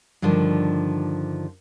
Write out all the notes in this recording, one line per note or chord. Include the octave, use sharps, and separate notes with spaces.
G2 D3 D#3 F3